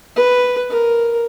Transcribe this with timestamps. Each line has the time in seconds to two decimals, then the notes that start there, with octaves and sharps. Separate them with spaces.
0.16 B4
0.70 A#4